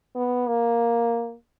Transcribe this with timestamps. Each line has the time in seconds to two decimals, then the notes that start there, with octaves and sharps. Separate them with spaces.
0.15 B3
0.47 A#3